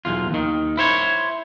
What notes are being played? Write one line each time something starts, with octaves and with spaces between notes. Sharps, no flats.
B1 E2 F4
D#2 D#3
E4 C5 C#5